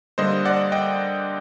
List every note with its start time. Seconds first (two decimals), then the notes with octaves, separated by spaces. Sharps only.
0.18 D3 G3 A#3 C5 D#5
0.45 D5 F#5
0.72 D#5 G5